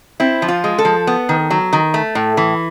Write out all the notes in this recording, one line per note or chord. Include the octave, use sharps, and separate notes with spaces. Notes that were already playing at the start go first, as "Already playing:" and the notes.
C4 E4
F3
F4
G#3
A4
F3
B3
D#3
F#3
D#3
A3
A2
E3